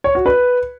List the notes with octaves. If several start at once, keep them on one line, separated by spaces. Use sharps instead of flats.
C#5
F#4
B4